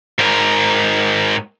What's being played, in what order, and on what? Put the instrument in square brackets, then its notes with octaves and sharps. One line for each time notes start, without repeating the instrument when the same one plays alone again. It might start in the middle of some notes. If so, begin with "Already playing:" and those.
[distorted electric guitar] G#2 A#4